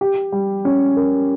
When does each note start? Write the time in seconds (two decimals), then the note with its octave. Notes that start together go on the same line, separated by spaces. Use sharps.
0.01 G4
0.32 G3
0.65 C#4
0.97 A#4